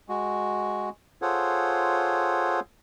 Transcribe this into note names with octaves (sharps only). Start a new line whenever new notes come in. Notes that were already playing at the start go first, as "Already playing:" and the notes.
G#3 F#4
F4 G#4 A4 C5 C#5 F#5